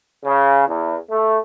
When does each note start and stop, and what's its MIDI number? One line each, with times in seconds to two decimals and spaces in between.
0.25 0.66 49
0.67 0.96 40
1.10 1.38 57